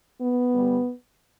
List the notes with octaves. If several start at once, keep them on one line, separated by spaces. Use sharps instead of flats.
B3
G1 G2 G3